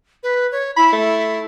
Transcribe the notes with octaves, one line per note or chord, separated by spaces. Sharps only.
B4
C#5
E4 B5
A3